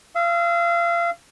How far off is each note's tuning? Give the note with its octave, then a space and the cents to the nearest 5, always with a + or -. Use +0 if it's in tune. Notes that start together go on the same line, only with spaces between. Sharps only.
F5 -30 E6 -30